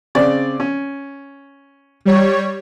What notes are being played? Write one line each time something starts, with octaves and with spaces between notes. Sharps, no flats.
C#3 C4 D5
C#4
G3 C#5